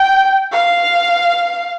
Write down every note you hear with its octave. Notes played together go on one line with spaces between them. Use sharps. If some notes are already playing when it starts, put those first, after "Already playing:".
Already playing: G5
F5